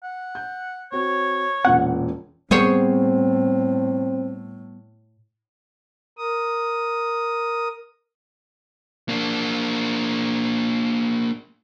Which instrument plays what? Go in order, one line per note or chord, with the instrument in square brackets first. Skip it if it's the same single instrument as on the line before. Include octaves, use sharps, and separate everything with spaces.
[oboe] F#5
[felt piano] G6
[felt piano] C4 F#4 [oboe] C#5
[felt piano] E1 A#2 C#4 [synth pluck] F#5
[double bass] A2 [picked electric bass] G3 B3 [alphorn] C4 [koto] G#4 C5 C#5
[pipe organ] A#4 D#6
[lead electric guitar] A#3 D4